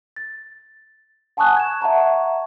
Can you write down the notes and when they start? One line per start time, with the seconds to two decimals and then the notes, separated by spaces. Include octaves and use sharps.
0.16 A6
1.37 F#5 G#5 A5 C#6 D#6 F#6
1.57 G#6 E7
1.81 E5 F#5 A5 A#5 C#6